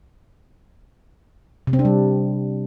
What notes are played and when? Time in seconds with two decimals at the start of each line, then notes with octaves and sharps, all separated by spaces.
1.67 C3
1.73 C4
1.79 D4
1.85 G3